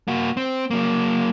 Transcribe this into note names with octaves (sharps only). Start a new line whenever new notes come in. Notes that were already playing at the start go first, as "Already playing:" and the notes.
A#3 F#4
C4
F#3 A#3